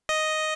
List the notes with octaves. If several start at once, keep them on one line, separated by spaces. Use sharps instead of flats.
D#5